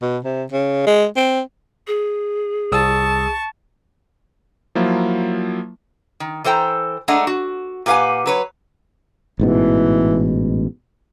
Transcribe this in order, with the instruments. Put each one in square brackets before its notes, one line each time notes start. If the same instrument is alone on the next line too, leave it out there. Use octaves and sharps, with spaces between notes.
[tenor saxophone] B2
C3
C#3
G#3
C4
[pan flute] G#4
[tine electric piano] C2 D#6 E6 [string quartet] A5 C#6
[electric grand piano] F3 F#3 A#3 E4 F4
[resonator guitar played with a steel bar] D#3
E3 A4 C5 G5 A#5
G#3 A3 D4 D#5 F#5 A#5
F#4
A#2 G4 B4 F5 F#5 G#5
F#3 B4 C#5
[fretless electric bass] A1 G#2 B2 [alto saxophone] E3